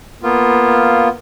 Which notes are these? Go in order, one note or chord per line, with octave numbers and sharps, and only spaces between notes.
A#3 B3 F4